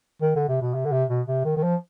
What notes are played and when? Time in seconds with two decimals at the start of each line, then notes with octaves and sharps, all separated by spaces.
0.22 D#3
0.35 D3
0.48 C3
0.61 B2
0.74 C3
0.85 D3
0.92 C3
1.09 B2
1.28 C3
1.45 D#3
1.57 D#3
1.63 F3